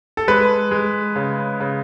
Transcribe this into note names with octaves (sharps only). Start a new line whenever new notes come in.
A4
G#3 B4
G#3
C#3
C#3